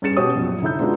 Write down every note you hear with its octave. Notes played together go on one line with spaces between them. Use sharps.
G2 C#4 G#4 A6 C#7 E7
B2 G4 C#5 D#6
A#1 F#2 A#2
D3 D#4 E4 E6 G6
G#3 B3 D4 D#4 F4 F#4